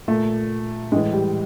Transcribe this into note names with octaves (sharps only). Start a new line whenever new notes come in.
A#2 A3
A2 E3 G#3
G3